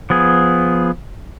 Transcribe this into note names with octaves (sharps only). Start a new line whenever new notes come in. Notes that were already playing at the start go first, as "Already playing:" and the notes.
F3 B3 G#4